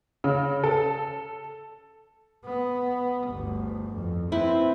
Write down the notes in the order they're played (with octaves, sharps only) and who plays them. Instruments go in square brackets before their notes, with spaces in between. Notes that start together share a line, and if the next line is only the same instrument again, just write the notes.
[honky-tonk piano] C#3
A4
[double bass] B3
G1 D2
F2
[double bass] C4 [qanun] E4 B4